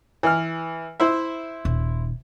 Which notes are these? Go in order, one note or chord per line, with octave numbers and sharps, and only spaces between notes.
E3 F6
E4 C5 E5
D#1